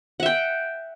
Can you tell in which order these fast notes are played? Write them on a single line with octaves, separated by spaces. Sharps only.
F#5 E5 G5